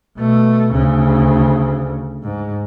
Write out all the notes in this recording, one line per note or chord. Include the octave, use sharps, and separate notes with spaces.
B2 A3
D2 C#3
G#2